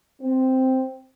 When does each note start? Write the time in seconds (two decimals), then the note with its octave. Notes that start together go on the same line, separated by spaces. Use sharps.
0.22 C4